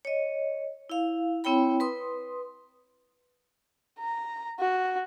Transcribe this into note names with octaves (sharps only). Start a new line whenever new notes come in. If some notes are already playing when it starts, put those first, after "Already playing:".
C#5 D#5
E4 F5
C4 E4 C#5 G5 B5
B4 C6 D#6
A#5
F#4